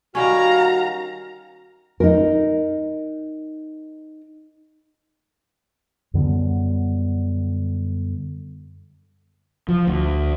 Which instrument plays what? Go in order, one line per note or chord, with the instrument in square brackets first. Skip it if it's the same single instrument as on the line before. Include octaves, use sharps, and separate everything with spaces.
[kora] D#3 G3 C#4 [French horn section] F#4 [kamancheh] F5 A#5
[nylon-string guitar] D#4 A#4
[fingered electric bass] F#2 D3 G3 B3
F3
D2